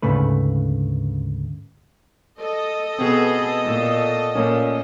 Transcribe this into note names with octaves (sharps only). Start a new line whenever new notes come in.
D2 G#2 C#3 A3 B4
A4 D#5
B2 B3 C4 G#4
A#2
A#2 A3 A#3 C#4